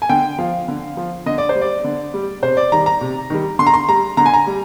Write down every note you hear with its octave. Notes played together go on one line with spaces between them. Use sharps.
G#5
D3 G5
F3 F5
D3
F3
D3 D#5
D5
C5
G3
D5
D3
G3
C3 C5
D5
D#3 G3 A#5
A#5
C3
D#3 G3
D3 C6
A#5
C6
G3 A#5
D3 A#5
G#5
A#5
G3